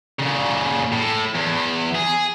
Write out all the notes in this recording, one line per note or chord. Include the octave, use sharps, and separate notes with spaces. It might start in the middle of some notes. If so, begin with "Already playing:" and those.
A#2 C#3
A2
E2
G#4